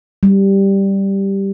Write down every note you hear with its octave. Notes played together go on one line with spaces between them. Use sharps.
G3